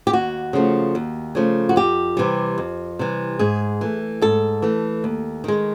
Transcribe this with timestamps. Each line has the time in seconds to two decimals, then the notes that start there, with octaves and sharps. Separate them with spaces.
0.07 G4
0.13 D#2 F#4
0.53 C#3 F3 A3
0.95 D#2
1.35 C#3 F3 A3
1.69 F#4
1.76 F2 G4
2.17 C3 E3 G3
2.58 F2
2.99 C3 E3 G3
3.39 G#2 G#4
3.81 E3 A3
4.21 G#2 A4
4.62 E3 A3
5.04 D#2
5.44 D#3 G#3